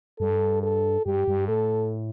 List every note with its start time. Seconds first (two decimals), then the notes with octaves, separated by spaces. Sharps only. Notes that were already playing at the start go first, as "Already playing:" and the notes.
0.19 G2 A4
0.63 A4
1.06 G2 G4
1.28 G2
1.48 A2 A4